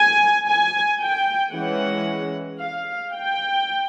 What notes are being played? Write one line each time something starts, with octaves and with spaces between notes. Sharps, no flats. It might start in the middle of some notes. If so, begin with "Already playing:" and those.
Already playing: G#5
G#5
G5
E3 G#3 C#4 F#5
F5
G5